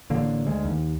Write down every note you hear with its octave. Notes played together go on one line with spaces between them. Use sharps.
A1 D3 A#3
D2 G#3
D#2